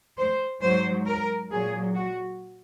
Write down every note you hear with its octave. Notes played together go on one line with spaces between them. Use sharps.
C5
G#2 F#3 C5
A#4
A#2 F#3 G#4
F#4